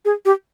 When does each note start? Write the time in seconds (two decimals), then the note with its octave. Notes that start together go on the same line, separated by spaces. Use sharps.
0.05 G#4
0.25 G4